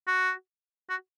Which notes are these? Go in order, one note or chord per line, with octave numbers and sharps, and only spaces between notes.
F#4
F#4